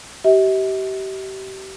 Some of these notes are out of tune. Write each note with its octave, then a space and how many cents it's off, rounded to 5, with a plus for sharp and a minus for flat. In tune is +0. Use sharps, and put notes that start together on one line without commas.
G4 -35 E5 -45